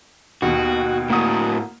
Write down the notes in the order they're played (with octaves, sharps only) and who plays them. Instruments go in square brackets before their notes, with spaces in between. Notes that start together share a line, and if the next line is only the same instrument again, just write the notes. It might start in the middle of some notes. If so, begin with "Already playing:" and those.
[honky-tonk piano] D#2 B2 [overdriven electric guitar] F#4
[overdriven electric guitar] A2 F#4 [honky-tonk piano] A#3 D#6